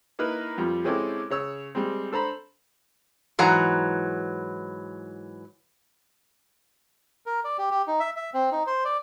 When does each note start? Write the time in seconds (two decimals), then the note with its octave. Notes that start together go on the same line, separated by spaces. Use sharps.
0.19 A#3 D#4 E4 A#4 B4
0.58 F2 F3 G3
0.84 G#3 C4 C#4 E4 G4 A4
1.30 C#3 C#5 E6
1.75 G3 G#3 C4
2.12 D4 A4 C5 A#5 B5
3.39 G#2 E3 F#3 A#5
7.26 A#4
7.44 D5
7.58 G4
7.71 G4
7.87 D#4
8.00 E5
8.16 E5
8.34 C4
8.52 D#4
8.67 C5
8.85 D5